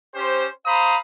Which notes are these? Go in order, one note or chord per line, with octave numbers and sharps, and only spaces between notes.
C#4 G4 C5
C5 F5 A#5 B5 D#6